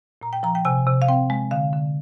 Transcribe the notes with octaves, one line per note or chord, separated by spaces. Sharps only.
A#2 A#5
G5
F3 A#5
G5
C3 G#5
C3
F5
C4 G5
G#3
D3 F5
D3